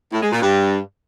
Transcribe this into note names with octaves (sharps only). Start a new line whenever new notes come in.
A2
G#3
A#2
G2